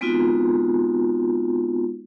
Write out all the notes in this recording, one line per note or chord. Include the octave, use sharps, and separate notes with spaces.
G#3 B3 C4 D#4 F4 F#4